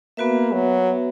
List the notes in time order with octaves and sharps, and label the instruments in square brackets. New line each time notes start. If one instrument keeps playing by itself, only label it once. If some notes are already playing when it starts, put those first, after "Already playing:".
[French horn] A#3 [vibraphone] B3 F#4 B4 E5
[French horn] F#3